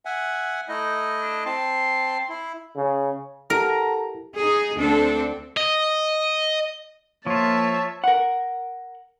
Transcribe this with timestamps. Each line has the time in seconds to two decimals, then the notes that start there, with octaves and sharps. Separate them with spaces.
0.05 E5 F#5 G#5
0.69 A3 D#4 E4 D#5
1.21 D4
1.46 C4 A5 C6
2.29 E4
2.77 C#3
3.50 E4 G4 A4 A#4 F#5 A5 A#5
4.36 D#4 G#4
4.75 D2 C4 D4 A4
5.57 D#5
7.27 F3 A#3 F4 C#5 E5 A5
8.04 A#4 F#5